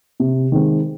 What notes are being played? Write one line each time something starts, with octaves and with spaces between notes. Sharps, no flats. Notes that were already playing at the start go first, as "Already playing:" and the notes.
C3
D#3 G#3 C4